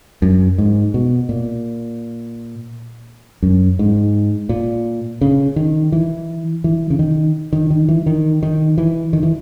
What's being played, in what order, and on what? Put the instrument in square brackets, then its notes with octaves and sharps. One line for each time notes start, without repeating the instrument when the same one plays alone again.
[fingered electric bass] F#2
G#2
B2
A#2
F#2
G#2
A#2
C#3
D#3
E3
E3
C#3
D#3
D#3
D#3
E3
D#3
D#3
E3
D#3
E3